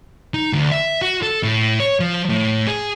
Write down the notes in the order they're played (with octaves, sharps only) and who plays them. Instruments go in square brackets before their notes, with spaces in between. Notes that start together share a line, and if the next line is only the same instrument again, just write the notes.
[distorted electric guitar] D#4
D2
E5
F#4
A4
A2
C#5
F3
A2
G#4